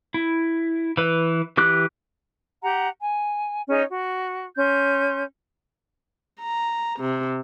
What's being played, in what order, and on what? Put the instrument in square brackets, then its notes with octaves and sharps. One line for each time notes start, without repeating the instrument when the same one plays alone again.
[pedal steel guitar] E4
E3 B4
E3 G4 D6 F#6
[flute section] G4 F#5 A#5
G#5
C#4 D#4 G#4 C#5
F#4
C#4 C6 G6
[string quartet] A#5
C3